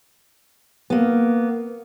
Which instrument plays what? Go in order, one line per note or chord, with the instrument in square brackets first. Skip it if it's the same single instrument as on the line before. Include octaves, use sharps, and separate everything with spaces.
[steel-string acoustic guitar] A#3 B3